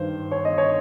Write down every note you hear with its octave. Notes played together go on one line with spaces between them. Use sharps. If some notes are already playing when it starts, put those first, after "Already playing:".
Already playing: G2 D#3 C5
C#5
D#5
C#5